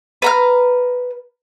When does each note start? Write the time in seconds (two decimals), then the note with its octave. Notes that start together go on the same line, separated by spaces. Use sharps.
0.22 B4 A#5 F6